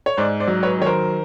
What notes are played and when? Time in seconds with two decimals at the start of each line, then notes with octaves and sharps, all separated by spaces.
0.06 C#5
0.17 G#2 C5 D5
0.40 C5 D5
0.48 F#3
0.63 B4 C#5
0.78 D#3 C#5
0.86 A#4 C5